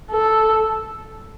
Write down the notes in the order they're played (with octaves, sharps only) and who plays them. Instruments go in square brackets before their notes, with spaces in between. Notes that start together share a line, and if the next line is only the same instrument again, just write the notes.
[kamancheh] A4